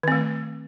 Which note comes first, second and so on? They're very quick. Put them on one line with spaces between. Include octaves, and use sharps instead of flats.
D#3 C4 A3